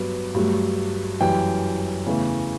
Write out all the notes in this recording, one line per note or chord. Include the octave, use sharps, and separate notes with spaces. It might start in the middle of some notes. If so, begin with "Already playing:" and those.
Already playing: G2 F#3 B3
G2 F#3 A3
F#2 E3 G3 G5
E2 C#3 E3 A3